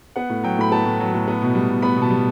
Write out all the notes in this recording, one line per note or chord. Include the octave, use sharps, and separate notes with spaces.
B3 F#5
A2
F#3 G5
A2 B5
B3 A5
A2
F#3
A2
B3
B2
G3
B2
B3 B5
B2 A5
G3